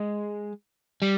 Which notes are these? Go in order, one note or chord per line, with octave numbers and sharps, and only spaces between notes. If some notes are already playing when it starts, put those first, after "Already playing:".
Already playing: G#3
G3